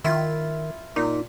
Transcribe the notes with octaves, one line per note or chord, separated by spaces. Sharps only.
D#3 E4 F4
A#2 D#4